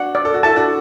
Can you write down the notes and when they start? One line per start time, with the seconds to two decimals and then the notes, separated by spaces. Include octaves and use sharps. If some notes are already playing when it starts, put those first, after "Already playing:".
Already playing: D4 F#4 F#5
0.15 D5
0.25 A4
0.34 F#4
0.43 E4 A4 A5
0.56 D4 F#4